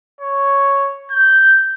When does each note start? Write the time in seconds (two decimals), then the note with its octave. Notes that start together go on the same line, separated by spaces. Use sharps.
0.21 C#5
1.11 G6